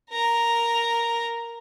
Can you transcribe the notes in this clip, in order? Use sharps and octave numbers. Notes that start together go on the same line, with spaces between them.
A#4 A#5